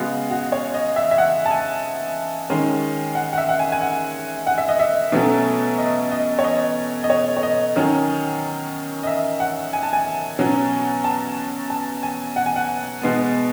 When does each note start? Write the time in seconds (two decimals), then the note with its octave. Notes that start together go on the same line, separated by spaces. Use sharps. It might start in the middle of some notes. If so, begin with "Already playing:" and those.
Already playing: C#3 G#3 B3 F#4
0.30 F#4
0.52 C#5
0.74 D#5
0.96 E5
1.11 E5
1.18 F#5
1.46 A5
1.51 G#5
2.50 D#3 G#3 C#4
3.15 F#5
3.33 F#5
3.38 E5
3.49 F#5
3.59 G#5
3.72 G#5
3.81 F#5
4.47 F#5
4.58 E5
4.69 D#5
4.79 E5
5.12 B2 F#3 A3 C#4
5.78 D#5
6.11 D#5
6.39 C#5
6.44 D#5
7.04 D#5
7.10 C#5
7.37 C#5
7.43 D#5
7.76 D#3 F#3 C#4
9.03 D#5
9.07 E5
9.40 F#5
9.73 G#5
9.83 A5
9.93 G#5
10.39 B2 F#3 C#4
11.04 A5
11.70 A5
12.03 G#5
12.36 F#5
12.46 G#5
12.56 F#5
13.01 B2 G#3 B3